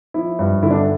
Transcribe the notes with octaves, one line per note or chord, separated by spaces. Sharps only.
F3 E4
G2
D3 E4
D4